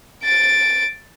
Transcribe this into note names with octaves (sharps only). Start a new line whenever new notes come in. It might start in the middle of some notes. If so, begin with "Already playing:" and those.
A6 D7